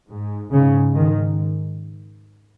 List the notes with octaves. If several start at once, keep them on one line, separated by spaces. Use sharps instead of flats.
G#2
G#2 C#3
G#2 D#3